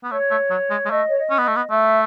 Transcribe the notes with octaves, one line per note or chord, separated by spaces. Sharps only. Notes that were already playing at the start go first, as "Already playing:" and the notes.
B3
A3 C#5
A3
F#3
G#3
G#3
A3 D#5
C#5
D#5
C#4
B3
A3 D#5
B3
A3 E5